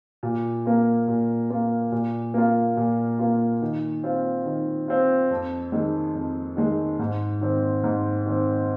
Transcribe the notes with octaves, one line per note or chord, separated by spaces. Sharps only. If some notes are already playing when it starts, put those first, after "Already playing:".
A#2
A#3 F4
A#2
A#3 F4
A#2
A#3 F4
A#2
A#3 F4
D#3
C4 F4
D#3
C4 F4
F2
D#3 G#3
F2
D#3 G#3
G#2
D#3 C4
G#2
D#3 C4